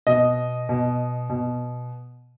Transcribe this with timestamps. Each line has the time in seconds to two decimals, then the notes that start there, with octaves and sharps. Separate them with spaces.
0.07 B2 D#5
0.69 B2
1.30 B2